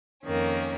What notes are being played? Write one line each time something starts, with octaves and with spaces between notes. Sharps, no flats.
F2 D#3 A#3 C#4